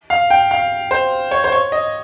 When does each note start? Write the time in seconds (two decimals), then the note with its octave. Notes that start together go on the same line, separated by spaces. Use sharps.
0.10 F5
0.30 G5
0.51 F5
0.91 C5
1.31 C#5
1.44 C5
1.52 C#5
1.72 D#5